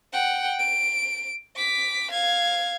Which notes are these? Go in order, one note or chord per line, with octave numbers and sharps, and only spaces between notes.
F#5 G5
D7
D6 B6
F5 G#6